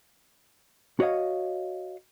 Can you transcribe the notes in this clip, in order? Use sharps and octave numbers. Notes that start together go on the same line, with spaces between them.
F#4 C#5 D#5 F5